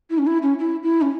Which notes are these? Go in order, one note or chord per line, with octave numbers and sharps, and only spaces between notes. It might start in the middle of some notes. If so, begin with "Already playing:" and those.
E4
C#4
E4
C#4
E4
E4
C#4